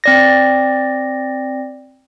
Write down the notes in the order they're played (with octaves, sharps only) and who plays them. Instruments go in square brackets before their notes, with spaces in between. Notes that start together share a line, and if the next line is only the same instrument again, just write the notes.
[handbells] C4 D5 A#6